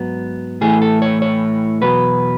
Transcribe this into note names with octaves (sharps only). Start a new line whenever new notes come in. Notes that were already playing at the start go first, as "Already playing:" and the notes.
Already playing: G#2 F#3 B3
A2 E3 A3 G#4
A4
C#5
C#5
E2 B2 F#3 B4